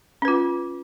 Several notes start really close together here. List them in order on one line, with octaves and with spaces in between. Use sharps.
C#4 B4 F4